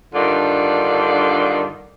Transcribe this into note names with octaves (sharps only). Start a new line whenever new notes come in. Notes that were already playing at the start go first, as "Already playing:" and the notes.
G2 D3 D#3 F4 D5